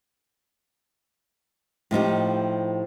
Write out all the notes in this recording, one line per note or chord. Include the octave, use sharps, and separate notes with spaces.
A2 F3 D#4 G4